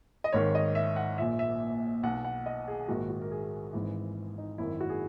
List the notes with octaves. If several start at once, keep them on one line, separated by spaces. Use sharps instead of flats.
D#5
G#1 G#2 D#3 C#5
D#5
E5
F#5
A#1 A#2 E5
E5
B1 B2 F#5
F#5
D#5
G#4
A#1 G#2 D#3 F#4
F#4
A#4
G#4
G#1 G#2 E3
D#4
G#1 F#2 D#3 E4
F#4
G#4